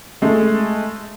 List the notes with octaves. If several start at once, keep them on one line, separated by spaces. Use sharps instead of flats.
G#3 A3